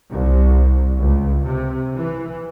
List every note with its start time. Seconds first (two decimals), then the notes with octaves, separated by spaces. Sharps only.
0.11 C2
0.98 C#2
1.44 C3
1.94 E3